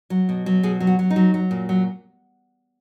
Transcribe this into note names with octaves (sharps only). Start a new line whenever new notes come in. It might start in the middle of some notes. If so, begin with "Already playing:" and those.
F#3
B2
F#3
B2 G#4
F#3
F#4
F#3
D#4
F#3
F#3
A#2
F#3